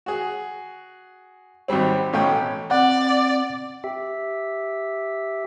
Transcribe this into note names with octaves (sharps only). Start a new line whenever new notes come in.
F#4 G#4
G#1 F#3 G3 C4
A1 B2 A3 C#4 G5
C4 D5 F#5
G4 E5